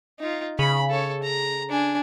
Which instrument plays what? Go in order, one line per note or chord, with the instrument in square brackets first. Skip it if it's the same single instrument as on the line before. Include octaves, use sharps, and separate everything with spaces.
[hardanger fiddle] D#4 F4
[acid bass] C#3 [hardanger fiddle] B5
[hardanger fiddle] A4 C#5
A#5
D4 G#5